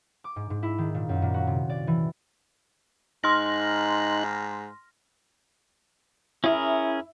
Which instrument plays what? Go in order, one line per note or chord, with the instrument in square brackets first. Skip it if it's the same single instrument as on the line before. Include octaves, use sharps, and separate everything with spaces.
[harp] D6
G#2
G#2
E4
D#3
A#2
F#2
A#2
F#4
C3
D5
E3
[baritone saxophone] G#2 [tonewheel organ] D#4 F#6 [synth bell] C6 F6 A#6
[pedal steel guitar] C#4 G#4 A#4 [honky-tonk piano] E4